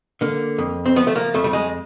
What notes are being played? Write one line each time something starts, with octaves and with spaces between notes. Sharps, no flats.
D3 A#3
F2
C4
F3 B3
A3
A#3
F2 A3
G3
G#3